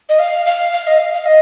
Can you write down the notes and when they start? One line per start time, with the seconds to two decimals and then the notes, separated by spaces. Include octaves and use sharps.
0.09 D#5
0.19 F5
0.46 F5
0.73 F5
0.87 D#5
0.98 F5
1.14 F5
1.25 D#5